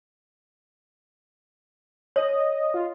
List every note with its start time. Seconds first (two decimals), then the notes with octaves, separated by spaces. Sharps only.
2.16 C#5 D#5
2.74 F4